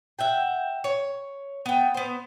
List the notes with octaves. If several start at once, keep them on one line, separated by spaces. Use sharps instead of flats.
E5 F#5 G5
C#5
B3 G5
B3 C5